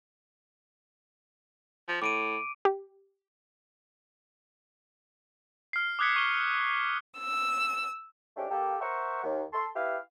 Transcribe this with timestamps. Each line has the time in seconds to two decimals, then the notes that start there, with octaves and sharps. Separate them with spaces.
1.88 F3
2.02 A2 D6 D7 D#7
2.65 G4
5.73 F6 C7
5.99 D6 D#6 F#6 G#6 B6 C#7
6.16 C#6 G7
7.18 E6
8.37 G#2 A3 C#4 D4 G4
8.50 A#3 G4 A4
8.81 A#4 C5 E5 F#5 C#6
9.23 D#2
9.53 A4 C6
9.76 E4 G4 B4 E5 F5